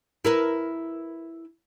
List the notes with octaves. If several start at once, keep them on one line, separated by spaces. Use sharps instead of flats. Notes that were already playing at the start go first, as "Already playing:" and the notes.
E4 A#4 B4